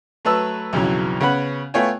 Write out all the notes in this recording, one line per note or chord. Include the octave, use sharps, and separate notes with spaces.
F#3 A3 B4 A5 E6
B1 F2 C#3 E3 F#3
C#3 B3 C#4 F#5 B5
A3 B3 F4 C#5 G5 G#5